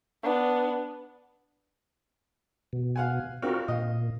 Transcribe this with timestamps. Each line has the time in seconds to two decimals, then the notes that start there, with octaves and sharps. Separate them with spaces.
0.23 B3 D4
2.73 B2
2.96 F5 F#5 G#5
3.42 C4 D4 F4 F#4 A#4
3.68 A#2 D#5 F5